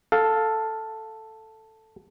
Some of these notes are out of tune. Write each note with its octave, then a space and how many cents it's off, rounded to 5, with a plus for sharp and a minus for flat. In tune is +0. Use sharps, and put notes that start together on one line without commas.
A4 +0 F5 +10